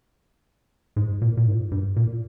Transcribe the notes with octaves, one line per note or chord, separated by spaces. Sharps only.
G#2
A#2
A#2
G#2
G2
A#2